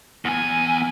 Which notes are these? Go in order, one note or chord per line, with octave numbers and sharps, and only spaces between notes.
E2 G#5